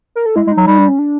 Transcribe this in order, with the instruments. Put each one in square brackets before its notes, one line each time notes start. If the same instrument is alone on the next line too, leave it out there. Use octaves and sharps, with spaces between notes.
[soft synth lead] A#4
A4
[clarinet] G#3 [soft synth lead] E4
[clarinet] G#3
[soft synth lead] D#4
[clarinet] F#3
[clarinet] G3 [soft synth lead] D#4
[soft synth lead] D4
C#4
D4